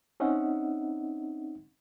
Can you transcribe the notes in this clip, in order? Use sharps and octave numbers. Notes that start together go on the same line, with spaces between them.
C4 C#4 D#4 D#5 E5 F#5